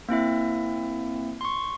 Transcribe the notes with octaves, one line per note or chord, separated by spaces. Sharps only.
A#3 C4 E4 E5
C6 C#6